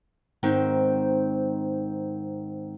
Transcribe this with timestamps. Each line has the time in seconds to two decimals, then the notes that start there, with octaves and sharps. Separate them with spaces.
0.43 G#2 D#3 C4